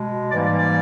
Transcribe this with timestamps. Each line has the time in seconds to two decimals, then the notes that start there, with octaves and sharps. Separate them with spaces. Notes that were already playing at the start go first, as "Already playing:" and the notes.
Already playing: B2 G#3
0.32 G#2 E3 G3 A#3 D5
0.45 D5
0.57 D5